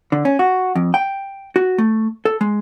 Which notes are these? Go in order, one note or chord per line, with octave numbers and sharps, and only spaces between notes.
D3
C#4
F#4
F2
G5
F#4
A3
A4
G#3